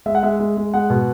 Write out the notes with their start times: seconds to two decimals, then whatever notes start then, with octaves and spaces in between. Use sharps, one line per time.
0.06 G#3 E5
0.15 F#5
0.23 G#3 E5
0.40 G#3
0.57 G#3
0.74 G#3 F#5
0.90 B2